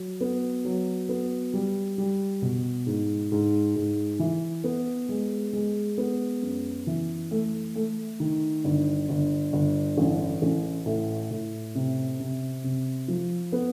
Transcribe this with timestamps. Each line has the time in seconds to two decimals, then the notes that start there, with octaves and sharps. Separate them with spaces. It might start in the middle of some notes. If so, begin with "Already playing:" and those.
Already playing: F#3
0.21 B3
0.65 F#3
1.09 B3
1.54 G3
1.98 G3
2.42 B2
2.86 G#2
3.32 G#2
3.76 G#2
4.19 E3
4.64 B3
5.09 G#3
5.53 G#3
5.98 B3
6.43 F#2
6.87 E3
7.31 A3
7.75 A3
8.20 D#3
8.64 G1
9.09 G1
9.53 G1
9.98 A1
10.42 A1
10.86 A2
11.31 A2
11.75 C3
12.20 C3
12.64 C3
13.08 F3
13.52 B3